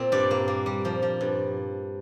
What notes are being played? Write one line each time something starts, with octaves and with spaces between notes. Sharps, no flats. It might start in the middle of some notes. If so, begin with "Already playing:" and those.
Already playing: A#2 C4
G2 D5
A#3
A#3
G3
F3
F3
G2